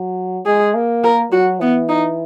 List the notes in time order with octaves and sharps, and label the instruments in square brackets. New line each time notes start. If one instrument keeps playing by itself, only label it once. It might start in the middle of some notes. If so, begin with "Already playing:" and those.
Already playing: [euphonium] F#3
[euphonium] G#3 [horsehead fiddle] G#4
[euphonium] A#3
[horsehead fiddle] A#4
[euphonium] F#3 [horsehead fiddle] F#4
[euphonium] E3 [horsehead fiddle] B3
[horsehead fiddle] D#4